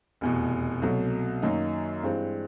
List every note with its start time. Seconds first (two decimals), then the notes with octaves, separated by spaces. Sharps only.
0.21 F1 E2 B2
0.82 C2 B2 F#3 A3
1.42 F#2 D#3 F#3 A#3 D#4
2.03 G2 E3 G#3 C4